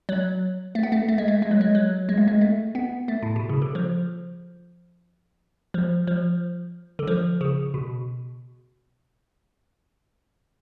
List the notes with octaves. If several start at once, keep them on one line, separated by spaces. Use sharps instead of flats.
F#3
A3
B3
A3
A3
G#3
A3
G#3
F#3
G#3
F#3
G#3
A3
G#3
A3
B3
A3
A2
B2
C#3
D3
F3
F3
F3
D3
F3
C#3
B2